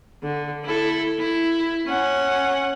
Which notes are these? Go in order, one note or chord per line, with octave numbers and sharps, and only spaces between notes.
D3
E4 A4
E4
C#4 F#5